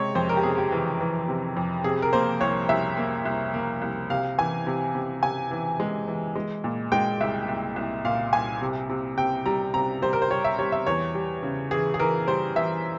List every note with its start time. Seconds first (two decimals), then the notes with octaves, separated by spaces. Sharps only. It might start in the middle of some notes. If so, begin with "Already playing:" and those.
Already playing: C3 G#3 C#5
0.15 F2 C5
0.29 A#4
0.37 G4
0.43 C3 G#4
0.58 G4
0.72 E3
1.01 E3
1.28 C3
1.57 F2
1.84 C3 G#4
2.02 A#4
2.13 A#3 C5
2.41 C2 C#5
2.69 C2 E5
2.97 A#3
3.25 C2
3.54 A#3
3.82 C2
4.10 C3 F5
4.38 E3 G#5
4.67 C3
4.95 C3
5.23 C3 G#5
5.51 E3
5.80 G#3
6.08 E3
6.35 G#3
6.64 A#2
6.92 G#3 G5
7.21 C2 E5
7.48 C2
7.76 C2
8.05 A#2 F5
8.33 C2 G#5
8.61 C3
8.89 C3
9.17 C3 G5
9.46 G3 A#5
9.74 C3 A#5
10.02 G3 C5
10.13 A#4
10.22 C5
10.30 G3 C#5
10.45 E5
10.59 G3 C#5
10.72 E5
10.86 E2 C#5
11.15 G3
11.43 C#3
11.71 E3 G#4
11.94 G#4
11.99 E3 A#4
12.28 G3 C5
12.56 E3 E5